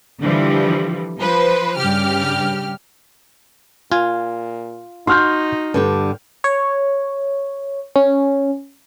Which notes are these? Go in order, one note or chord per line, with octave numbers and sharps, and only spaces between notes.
D3 E3 F3 G3
F3 B4 C5
G2 C#3 G4 F6
A#2 F4 G#5
D#4 F#4 C6 F6 G6
G2 D3 G4
C#5
C#4